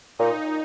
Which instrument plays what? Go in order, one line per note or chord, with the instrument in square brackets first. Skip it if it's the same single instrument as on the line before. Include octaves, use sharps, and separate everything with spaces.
[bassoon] A#2 [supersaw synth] D#4